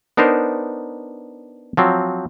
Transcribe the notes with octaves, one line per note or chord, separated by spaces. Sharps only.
B3 D4 D#4 A#4 C5
F3 F#3 C4